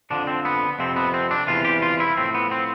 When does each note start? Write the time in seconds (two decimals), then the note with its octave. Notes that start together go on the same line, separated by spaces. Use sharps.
0.10 F2 D3 F3 D4
0.27 C4
0.45 B3
0.79 F2 C3 F3 C4
0.96 B3
1.14 C4
1.31 D4
1.47 E2 C3 E3 F4
1.65 G4
1.82 F4
2.00 E4
2.16 A2 F3 C4
2.34 B3
2.51 C4